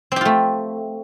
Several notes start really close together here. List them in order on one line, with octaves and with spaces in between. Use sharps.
C4 G4 F4 A3